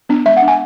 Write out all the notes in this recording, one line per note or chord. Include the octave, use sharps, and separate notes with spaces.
B3 D4
G#3 E5
F#5
D4
G#5